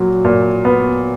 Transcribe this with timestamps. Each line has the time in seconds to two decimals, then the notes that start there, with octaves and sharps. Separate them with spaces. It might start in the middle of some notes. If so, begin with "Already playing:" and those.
Already playing: A#2 F#3
0.25 A#2
0.65 B3